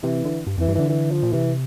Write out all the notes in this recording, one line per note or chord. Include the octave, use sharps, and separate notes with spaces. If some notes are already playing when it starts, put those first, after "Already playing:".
C3 E3
D3
G2
F2 E3
G2
D3 E3
E3
F3
A#2
C3 E3